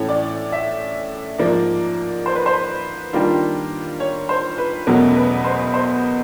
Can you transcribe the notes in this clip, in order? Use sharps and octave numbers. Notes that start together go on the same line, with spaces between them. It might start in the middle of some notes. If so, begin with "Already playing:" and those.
Already playing: A2 E3 A3 C#4 C#5
D5
E5
G#2 F3 A#3 D5
C5
B4
C5
D#3 G3 A#3 D4 F4
C#5
C5
B4
E2 B2 F#3 A3 C#4 A#4
B4
C5
C5